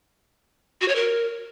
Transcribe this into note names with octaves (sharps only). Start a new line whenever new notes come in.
F#4
C#5
A#4